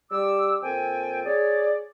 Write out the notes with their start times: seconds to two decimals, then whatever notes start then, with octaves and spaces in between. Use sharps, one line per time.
0.11 G3 D6 E6
0.62 A#2 F3 C4 A4 G5 G#5
1.25 G#4 C#5 D5